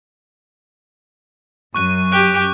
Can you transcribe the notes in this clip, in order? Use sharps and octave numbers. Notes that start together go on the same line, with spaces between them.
F#2 C#6 F#6 D#7
G4 F#6